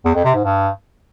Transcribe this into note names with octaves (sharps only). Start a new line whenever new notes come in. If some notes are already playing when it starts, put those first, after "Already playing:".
E2
F2
C3
G#2
G2